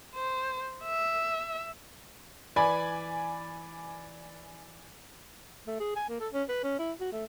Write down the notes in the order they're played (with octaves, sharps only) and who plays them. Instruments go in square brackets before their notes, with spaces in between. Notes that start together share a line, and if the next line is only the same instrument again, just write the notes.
[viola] C5
E5
[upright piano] E3 D5 G#5 B5
[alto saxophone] A3
G#4
G#5
A#3
A4
C#4
B4
C#4
E4
F#4
A3